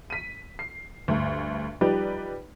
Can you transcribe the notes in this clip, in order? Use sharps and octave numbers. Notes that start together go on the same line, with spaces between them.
B6 D#7
C7
D2 G2
F3 G3 D#4 G4 B4 D5